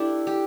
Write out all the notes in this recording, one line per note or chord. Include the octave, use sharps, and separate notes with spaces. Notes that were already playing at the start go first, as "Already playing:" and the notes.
Already playing: D4 E4 G4 A4
G4